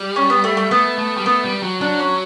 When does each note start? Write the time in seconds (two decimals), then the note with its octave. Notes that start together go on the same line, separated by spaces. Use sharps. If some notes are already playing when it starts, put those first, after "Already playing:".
Already playing: G3
0.16 C#4
0.30 B3
0.44 A3
0.57 A3
0.71 A3 B3
0.98 A3
1.17 G3
1.26 A3 B3
1.45 G3
1.63 F#3
1.81 F#3 D4
2.00 C#4